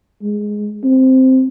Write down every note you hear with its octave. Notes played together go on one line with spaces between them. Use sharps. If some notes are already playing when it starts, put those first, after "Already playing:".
G#3
C4